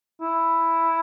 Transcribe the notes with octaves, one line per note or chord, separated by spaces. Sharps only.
E4